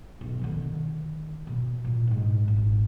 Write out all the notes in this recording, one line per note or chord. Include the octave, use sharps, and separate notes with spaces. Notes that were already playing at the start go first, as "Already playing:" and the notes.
B1
D3 D#3
B2
A#2
G#2 G#3
G#1